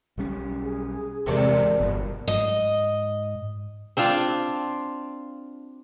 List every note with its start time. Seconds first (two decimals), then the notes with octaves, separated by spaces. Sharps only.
0.18 B1 G3 C#4
0.64 G#4
1.26 D1 E2 C3 G#3 A4 A#4 C#5 D5
1.80 G1 B2
2.28 G#2 D#5
3.97 C4 D4 F4 F5